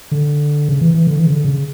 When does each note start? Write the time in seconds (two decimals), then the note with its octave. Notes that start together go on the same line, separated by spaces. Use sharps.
0.11 D3
0.68 C#3
0.81 E3
0.94 E3
1.07 D3
1.19 E3
1.26 C#3
1.32 D3
1.44 C#3